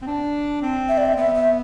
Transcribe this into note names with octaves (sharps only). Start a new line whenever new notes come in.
C4
D4
C4
E5
D5
E5
B3 E5
E5